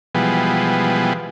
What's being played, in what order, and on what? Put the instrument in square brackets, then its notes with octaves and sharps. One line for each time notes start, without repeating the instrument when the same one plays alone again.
[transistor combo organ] B2 E3 F3 G3 G#3 B3